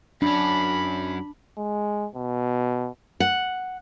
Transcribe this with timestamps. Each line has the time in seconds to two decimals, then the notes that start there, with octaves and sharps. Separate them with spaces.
0.22 F#2 C#4 D4 B5
1.58 G#3
2.15 B2
3.20 F#5